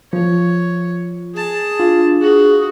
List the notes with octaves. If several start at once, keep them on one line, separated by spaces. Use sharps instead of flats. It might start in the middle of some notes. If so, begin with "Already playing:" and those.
F3 C#5
G#4 A5
D4 F4
F#4 G#4